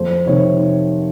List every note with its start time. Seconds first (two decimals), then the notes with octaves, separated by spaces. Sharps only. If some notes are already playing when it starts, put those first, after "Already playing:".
Already playing: F2 C5
0.26 C3 D#3 C#5